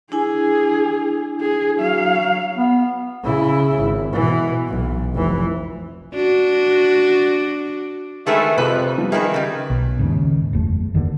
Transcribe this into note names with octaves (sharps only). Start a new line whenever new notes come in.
D4 E4 G#4 G#5
G#4
F#3 F5
B3
C#3 E4
G#1
B2 E3
B1
F1 E3
D4 F#4
D#3 G#3 A3 G#4 B4
F2 C3 B4
F3 G3 B3
D#3 G#4 B4 E5
C#3 G3
B1
D#2 G#2 C#3
F#1 E2 A3
F#1 D#2 D3